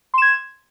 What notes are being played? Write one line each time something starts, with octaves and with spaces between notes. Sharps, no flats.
C6 G#6 E7